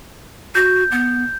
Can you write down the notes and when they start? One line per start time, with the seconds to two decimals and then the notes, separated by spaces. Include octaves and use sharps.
0.55 F#4 G6
0.92 B3